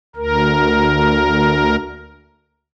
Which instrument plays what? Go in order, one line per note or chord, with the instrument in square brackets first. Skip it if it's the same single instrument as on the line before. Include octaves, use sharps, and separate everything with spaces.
[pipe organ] D2 A#4